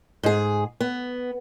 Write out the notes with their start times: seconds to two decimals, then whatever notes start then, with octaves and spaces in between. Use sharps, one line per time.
0.23 G#2 G#4
0.81 B3